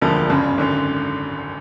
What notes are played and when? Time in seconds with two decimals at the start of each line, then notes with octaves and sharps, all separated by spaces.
0.01 E1 D2 D3 F3 A#3
0.30 G1 F#2 C#3
0.58 G#1 F#2 D3